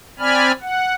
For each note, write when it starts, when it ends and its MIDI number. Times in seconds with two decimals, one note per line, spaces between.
0.19 0.52 60
0.19 0.52 74
0.19 0.52 80
0.19 0.52 83
0.19 0.52 89
0.61 0.95 78